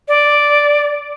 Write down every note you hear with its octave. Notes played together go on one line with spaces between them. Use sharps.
D5